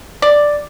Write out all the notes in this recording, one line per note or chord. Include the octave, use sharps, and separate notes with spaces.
D5